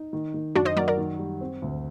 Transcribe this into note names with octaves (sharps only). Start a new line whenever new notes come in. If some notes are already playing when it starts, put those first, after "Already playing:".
Already playing: D#4
D#3
D#3
F#2 D4 F#4
C5 D#5
F#3 A#4 D5
A#4 D5
D#3
G3
C4
D2